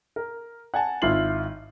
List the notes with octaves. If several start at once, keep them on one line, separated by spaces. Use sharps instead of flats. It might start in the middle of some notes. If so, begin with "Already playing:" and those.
A#4
F#5 G#5 A5
G#1 E4 F4 C7 F#7